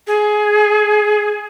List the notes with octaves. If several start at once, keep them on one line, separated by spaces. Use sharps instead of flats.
G#4